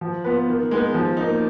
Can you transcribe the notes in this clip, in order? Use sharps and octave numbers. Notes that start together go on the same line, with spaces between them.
F3
B3 F4 B4
D#3
G#3 B3 D#4
F3
A#3 D#4